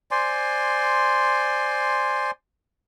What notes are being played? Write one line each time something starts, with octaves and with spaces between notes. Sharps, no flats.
C5 D5 G#5 C6